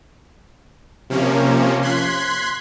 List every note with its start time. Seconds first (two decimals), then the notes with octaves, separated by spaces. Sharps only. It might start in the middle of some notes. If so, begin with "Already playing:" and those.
1.10 C3 F3 A#3 C#4
1.82 C6 F#6 G#6 B6